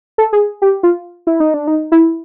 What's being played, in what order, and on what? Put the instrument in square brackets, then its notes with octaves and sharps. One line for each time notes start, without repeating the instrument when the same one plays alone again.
[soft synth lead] A4
G#4
G4
F4
E4
D#4
D4
D#4
E4